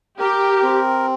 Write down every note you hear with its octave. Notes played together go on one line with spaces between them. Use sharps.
G4 A#4
C4